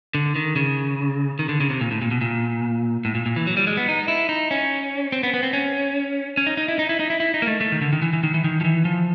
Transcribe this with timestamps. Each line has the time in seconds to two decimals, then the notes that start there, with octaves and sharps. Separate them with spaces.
0.15 D3
0.35 D#3
0.56 C#3
1.39 D#3
1.49 D3
1.60 C#3
1.70 C3
1.81 A#2
1.91 A2
2.02 A#2
2.11 B2
2.21 A#2
3.05 A2
3.15 A#2
3.26 A#2
3.36 E3
3.47 F#3
3.57 G3
3.67 G#3
3.77 B3
3.89 D#4
4.08 E4
4.29 D#4
4.51 C#4
5.12 C4
5.23 B3
5.34 B3
5.43 C4
5.53 C#4
6.37 C#4
6.47 D#4
6.57 D#4
6.68 E4
6.79 D#4
6.89 E4
7.00 D#4
7.10 E4
7.20 E4
7.34 D#4
7.42 A#3
7.47 A3
7.61 A3
7.72 D#3
7.81 D3
7.93 D#3
8.02 E3
8.13 E3
8.24 D#3
8.34 E3
8.44 D#3
8.61 F3
8.64 E3
8.85 F3